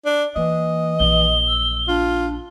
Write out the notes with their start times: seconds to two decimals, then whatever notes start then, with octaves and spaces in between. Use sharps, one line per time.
0.06 D4
0.36 E3 A#3 D#5
0.99 A#1 D#4 G7
1.47 E6
1.88 D4 F4